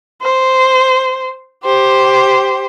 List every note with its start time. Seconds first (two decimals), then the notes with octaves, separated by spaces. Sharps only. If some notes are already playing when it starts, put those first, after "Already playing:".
0.22 C5
1.65 G4 C5